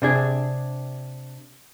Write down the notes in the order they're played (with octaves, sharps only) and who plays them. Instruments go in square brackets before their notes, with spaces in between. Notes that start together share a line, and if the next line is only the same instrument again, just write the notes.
[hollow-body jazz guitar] C3 D4 G#4